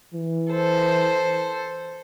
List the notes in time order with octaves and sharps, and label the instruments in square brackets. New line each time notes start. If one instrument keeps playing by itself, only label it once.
[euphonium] E3
[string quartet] A4 C5